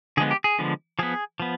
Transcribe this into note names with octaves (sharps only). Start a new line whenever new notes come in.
D3 F3 G#3 B3 G#4
G4
G#4
D3 F3 G#3 B3
F3 B3 G#4
F3 B3